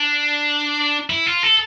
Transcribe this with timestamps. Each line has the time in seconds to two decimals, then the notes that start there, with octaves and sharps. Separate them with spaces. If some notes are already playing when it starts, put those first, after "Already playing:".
Already playing: D4
1.10 E4
1.26 F4
1.43 A4